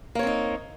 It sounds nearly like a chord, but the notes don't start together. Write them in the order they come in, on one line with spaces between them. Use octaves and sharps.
A#3 C#5 C4 D#4